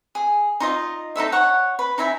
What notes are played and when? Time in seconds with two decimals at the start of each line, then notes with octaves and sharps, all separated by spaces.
0.15 G#4
0.60 D#4 F4 D#5
1.16 D#4 E4 A4 E5
1.32 C#5 F#5
1.79 B4
1.98 D#4 E4 E5 G#5